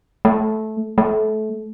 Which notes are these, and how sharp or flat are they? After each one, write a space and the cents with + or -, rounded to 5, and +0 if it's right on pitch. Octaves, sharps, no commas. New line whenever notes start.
A3 -15
A3 -25